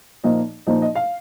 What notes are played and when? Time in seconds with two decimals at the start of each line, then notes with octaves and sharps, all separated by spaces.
0.23 A#2 F3 A#3 D#4 D#5
0.67 A#2 F3 A#3 D#4 D#5
0.82 D#5
0.95 F5